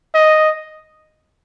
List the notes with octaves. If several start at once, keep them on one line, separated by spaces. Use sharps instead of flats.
D#5